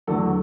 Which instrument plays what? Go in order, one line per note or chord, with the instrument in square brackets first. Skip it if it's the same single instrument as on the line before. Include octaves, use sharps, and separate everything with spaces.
[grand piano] E2 D3 F#3 A3 A4